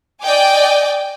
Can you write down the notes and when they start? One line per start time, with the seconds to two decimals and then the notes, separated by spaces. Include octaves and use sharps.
0.22 D5 D#5 G5 G#5 D6